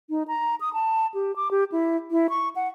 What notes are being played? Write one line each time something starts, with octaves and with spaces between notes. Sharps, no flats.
D#4
A#5
D#6
A5
G4
D6
G4
E4
E4
C#6
F#5